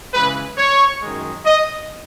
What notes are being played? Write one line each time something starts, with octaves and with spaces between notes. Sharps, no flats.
C#3 E3 G#3 B4
C#5
F#2 D#3 G#3
D#5